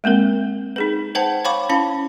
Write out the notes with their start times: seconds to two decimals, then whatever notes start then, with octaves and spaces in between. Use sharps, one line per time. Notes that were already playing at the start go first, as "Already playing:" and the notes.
0.04 G#3 A#3 C4 A#4
0.76 D#4 G#4 B4
1.15 B4 C5 F#5 G5 A5
1.45 C#5 F5 G5 B5 C#6 D6
1.69 C#4 E4 F5 A5 B5